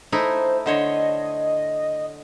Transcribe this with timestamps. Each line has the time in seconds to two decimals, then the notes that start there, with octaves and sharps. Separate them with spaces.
0.12 A3 D#4 E4 C5
0.66 D3 C5 C#5 D#5